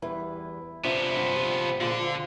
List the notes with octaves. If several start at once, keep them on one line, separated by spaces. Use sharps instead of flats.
E2 G3 E4 B4
C3 F3 B3 D4 D5 E5 B5
G2 F#5
G3 C4 F4
A#2 D3 G#3 F4